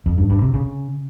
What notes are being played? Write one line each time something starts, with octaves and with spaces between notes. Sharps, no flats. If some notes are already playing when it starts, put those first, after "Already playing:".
F2
G2
G2
C3
C#3